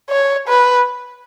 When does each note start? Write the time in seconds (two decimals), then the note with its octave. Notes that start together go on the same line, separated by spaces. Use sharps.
0.10 C#5
0.48 B4